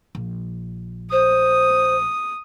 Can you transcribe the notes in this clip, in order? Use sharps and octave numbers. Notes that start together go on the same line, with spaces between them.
A#1
C5 D#6